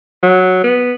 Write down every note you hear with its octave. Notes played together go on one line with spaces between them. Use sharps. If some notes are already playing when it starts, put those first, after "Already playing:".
F#3
B3